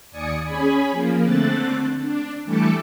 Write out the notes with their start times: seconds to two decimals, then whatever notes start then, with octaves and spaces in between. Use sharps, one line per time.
0.12 D#2 D5 G#5 D#6 C#7
0.45 C#4 G#4 G#5 B5
0.91 F3 A#3
1.24 D3 A3 C4 F#6 A6
2.02 D4
2.44 E3 G3 A3 A4 D6 C#7